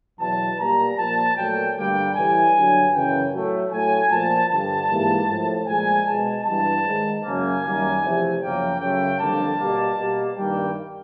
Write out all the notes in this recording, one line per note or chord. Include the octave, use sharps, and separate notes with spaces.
E2 B2 F#3 A5
A#2 G3 A#3 A#5
A#2 F3 A#3 A5
A#2 F#3 A3 G5
G2 D3 G3 A#3 G5
A2 E3 G3 G#5
G2 D3 F#3
F#2 C#3 E3 G5
A2 F#3 A3
A2 F#3 A3 G#5
A#2 F3 A#3 A5
G2 D3 G3 A5
G#2 E3 G3 A#3
A2 F3 A3
A#2 F3 G#3 G#5
B2 G#3 A5
G2 E3 G3 A5
G#2 D#3 G#3
F#2 C#3 F#3 A#3 G#5
F#2 D#3 G3 A#3
E2 C3 F3 A3
F#2 C#3 F3 A#3 G5
F#2 C#3 F#3 A3 G5
F2 D3 G3 A#3 A5
B2 G3 A#3
B2 G3 A#3
G2 D#3 G3 A#3 G5